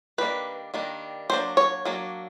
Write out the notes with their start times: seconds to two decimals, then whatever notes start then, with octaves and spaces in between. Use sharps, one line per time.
0.18 D#3 G3 A#3 D4 B4
0.74 D#3 G3 A#3 D4
1.30 F#3 A#3 D4 C5
1.57 C#5
1.85 F#3 A#3 D4